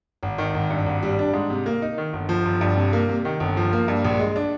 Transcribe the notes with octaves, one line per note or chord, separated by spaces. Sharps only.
G#1
D#3
G#1
G2
G#1
G3
D4
G#2
C3
A#3
D#4
D#3
G1
F3
G1
G2
C3
A#3
C3
D#3
G1
F3
A#3
G2
A#1
G#3
D4